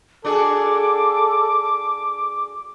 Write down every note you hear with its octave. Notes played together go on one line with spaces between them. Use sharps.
D4 F#4 G#4 A4 D6